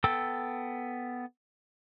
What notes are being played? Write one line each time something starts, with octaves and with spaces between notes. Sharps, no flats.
B3 A4 G5 E6